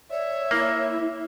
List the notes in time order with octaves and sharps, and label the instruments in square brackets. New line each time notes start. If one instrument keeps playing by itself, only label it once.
[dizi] C#5 [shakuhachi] D5 [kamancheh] E5
[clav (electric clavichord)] A#3 [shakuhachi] E4